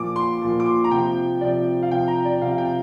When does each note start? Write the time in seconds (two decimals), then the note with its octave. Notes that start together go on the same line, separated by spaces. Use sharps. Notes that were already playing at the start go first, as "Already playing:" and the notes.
Already playing: A#2 F3 D6
0.16 C6
0.41 A#2 F3
0.60 D6
0.66 C6
0.84 A#5
0.91 C3 F3 G5
1.41 C3 F3 D5
1.83 F5
1.91 C3 F3 G5
2.08 A#5
2.25 D5
2.41 C3 F3 F5
2.58 G5